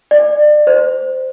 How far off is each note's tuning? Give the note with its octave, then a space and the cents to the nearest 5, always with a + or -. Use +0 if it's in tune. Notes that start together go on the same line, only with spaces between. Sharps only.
D5 +30
C5 -10